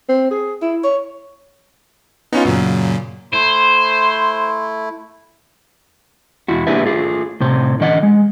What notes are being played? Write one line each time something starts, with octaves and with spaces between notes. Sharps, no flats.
C4
G#4
E4
C#5
B3 C#4 D#4 F4
F#2 A#2 C#3 F#3
A3 E4 C5 C6
E2 E4 F#4
A#3 D4 G4 G#4 B4 E5
A3 F4 G#4
A2 C3 C5
D3 E3 D#5 F#5
G#3